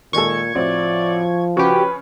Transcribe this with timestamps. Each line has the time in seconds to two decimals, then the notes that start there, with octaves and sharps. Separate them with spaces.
0.13 A#2 D#3 G#3 A4 C#6 G#6
0.55 A2 F3 C4 F#4 D5
1.57 C#3 F#4 G4 B4 C#6